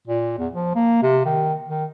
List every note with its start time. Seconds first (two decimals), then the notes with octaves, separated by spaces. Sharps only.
0.08 A#2
0.38 E2
0.53 F3
0.75 A#3
1.03 C3
1.26 D#3
1.68 D#3